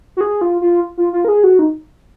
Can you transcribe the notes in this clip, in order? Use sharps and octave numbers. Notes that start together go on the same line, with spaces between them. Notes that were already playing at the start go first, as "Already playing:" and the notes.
F#4
G#4
F4
F4
F4
F4
A#4
G#4
F#4
D#4